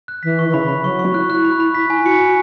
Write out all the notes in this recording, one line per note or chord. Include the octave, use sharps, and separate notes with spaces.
F#6
E3 B6
C#6
E3
C#3 B5
C#3
B5
F#3 C#6
C#6
F#4
E4 F#6
F#6
B5
B5
E4 B6
G#5
E4
F#4 C#7
G#5